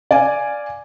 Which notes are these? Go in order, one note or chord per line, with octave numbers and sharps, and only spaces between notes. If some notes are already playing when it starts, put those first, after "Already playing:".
D5 F5 G#5